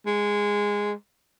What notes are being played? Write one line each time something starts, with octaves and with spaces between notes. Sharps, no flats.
G#3